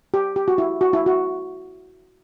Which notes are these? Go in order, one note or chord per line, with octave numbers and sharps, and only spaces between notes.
G4
G4
F#4
E4
F#4
E4
F#4